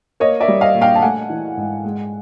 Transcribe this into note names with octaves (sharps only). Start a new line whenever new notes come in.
A#3 C#5 D#5
D5 E5
G3
D#5 F5
A#2
F5 G5
A5
A3 F#5 G#5
E3
G#2
G#3